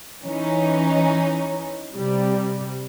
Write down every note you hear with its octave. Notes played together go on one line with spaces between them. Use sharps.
E3 C#4 D#4
C3 G3